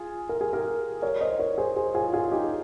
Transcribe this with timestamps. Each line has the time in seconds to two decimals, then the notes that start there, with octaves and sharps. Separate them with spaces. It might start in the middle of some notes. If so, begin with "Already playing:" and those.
Already playing: F4 G#4
0.29 A#4
0.41 G#4
0.53 G4 A#4
1.02 A#4 C#5
1.21 C5 D#5
1.39 A#4 C#5
1.58 G#4 C5
1.76 G#4 C5
1.94 F4 G#4
2.13 F4 G#4
2.32 D#4 G4